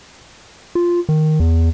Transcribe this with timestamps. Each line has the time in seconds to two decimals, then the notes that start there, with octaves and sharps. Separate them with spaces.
0.75 F4
1.09 D#3
1.40 E2